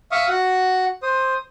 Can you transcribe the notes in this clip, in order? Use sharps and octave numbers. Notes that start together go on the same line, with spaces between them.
E5 F5 C#6 D#6
F#4 F#5
C5 D#6